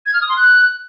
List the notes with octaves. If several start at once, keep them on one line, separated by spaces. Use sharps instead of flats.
G#6
F6
D#6
C6
F#6